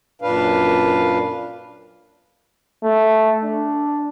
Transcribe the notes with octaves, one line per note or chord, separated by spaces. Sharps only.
F#2 A#2 D4 B4 F5
A3
D4